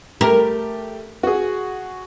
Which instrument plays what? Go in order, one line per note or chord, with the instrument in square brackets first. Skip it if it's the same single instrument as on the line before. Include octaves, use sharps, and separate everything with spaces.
[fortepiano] A3 G4 [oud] A#4
[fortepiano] F#4 G#4